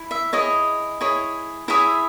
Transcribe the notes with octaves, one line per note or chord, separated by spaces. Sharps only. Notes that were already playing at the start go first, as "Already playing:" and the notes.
Already playing: E4
E5
E4 G#4 C#5 D#5
E4 G#4 C#5
E4 G#4 C#5 E5